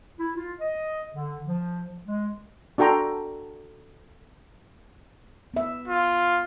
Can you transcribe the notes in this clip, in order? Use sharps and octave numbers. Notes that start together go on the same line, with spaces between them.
E4
F4
D#5
D3
F3
G#3
D4 F#4 A4 G5 A#5 C6
B3 E5
F4